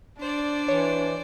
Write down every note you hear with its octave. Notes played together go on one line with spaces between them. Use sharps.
D4 C5 D5
E3 C#5